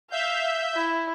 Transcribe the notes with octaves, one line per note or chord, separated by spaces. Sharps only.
E5 F5 G6
E4